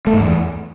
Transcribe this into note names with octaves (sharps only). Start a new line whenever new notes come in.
A3
G#2
E2